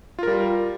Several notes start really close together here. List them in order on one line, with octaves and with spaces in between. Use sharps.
F4 A#4 G3